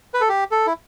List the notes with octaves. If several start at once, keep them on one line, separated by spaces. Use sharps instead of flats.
B4
A4
G4
A4
E4